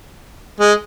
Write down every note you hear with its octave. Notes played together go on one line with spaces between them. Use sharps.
G#3